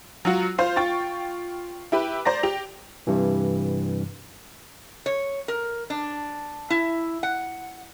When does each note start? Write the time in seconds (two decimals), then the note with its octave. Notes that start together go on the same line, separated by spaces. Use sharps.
0.25 F#3 F4 F#4
0.58 F4 C5 F5
0.76 F4 G5 C#6 A6
1.92 E4 G4 B4
2.25 C5 D5 A#5 A#6
2.43 G4 F7
3.07 G2 C3 E3
5.06 C#5
5.48 A#4
5.90 D4
6.70 E4
7.23 F#5